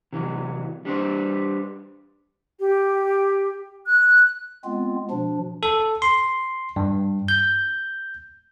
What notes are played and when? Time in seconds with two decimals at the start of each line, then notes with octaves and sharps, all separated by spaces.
0.13 C3 E3 F#3
0.85 G3 D4 B4 C5
2.60 G4
3.86 F#6
4.64 G#3 B3 C4 F4
5.10 B2 F3 D4
5.63 A4
6.02 C6
6.76 G2
7.28 G6